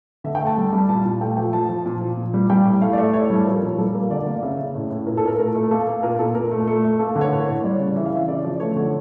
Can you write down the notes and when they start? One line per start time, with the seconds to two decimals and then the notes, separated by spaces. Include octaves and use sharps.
0.24 D3 E5
0.35 G5
0.41 A3
0.47 A5
0.57 G3
0.68 A5
0.73 G3
0.78 A5
0.89 A#2 A5
1.05 A#2
1.21 A3 G5
1.37 F3 G5
1.53 F3 A5
1.69 F3
1.86 A#2
2.01 F3
2.17 A#2
2.34 G3
2.50 G3 G5
2.66 A2
2.82 A3 F5
2.93 D5
2.98 A3 E5
3.14 A2 C#5
3.30 G3
3.36 A4
3.46 F3 A#4
3.62 A#2
3.78 G3 A4
3.94 A#3 A#4
4.10 D3 D5
4.27 A#3
4.42 C#3 E5
4.59 C#3
4.75 A2
4.90 A2
5.07 A#2 A#4
5.17 A4
5.23 A#2 A#4
5.39 A3 A#4
5.55 A3
5.71 A#3 A4
5.87 A#3
6.03 A#2 A#4
6.19 A#2 A4
6.35 A#2 A#4
6.51 A3
6.67 A3
6.84 A3
6.99 A#3 A4
7.16 D3
7.21 C#5
7.32 A2 A#4
7.48 A2 C#5
7.64 G3 D5
7.79 C#3
7.96 E3 E5
8.06 F5
8.12 E3 E5
8.28 C#3 D5
8.44 F3
8.60 A3 C#5
8.76 D3